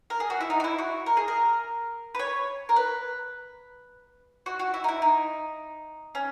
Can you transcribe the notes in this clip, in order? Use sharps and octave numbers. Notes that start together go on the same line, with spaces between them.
A#4
G#4
F#4
E4
D#4
F#4
E4
F#4
A#4
G#4
A#4
B4
C#5
A#4
B4
F#4
F#4
E4
D#4
E4
D#4
C#4